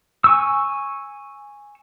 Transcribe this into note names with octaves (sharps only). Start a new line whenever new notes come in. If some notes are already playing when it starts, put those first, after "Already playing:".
G#5 C#6 E6